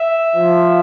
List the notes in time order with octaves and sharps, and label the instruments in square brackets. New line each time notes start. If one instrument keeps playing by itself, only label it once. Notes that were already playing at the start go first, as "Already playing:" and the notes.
Already playing: [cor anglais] E5
[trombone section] F3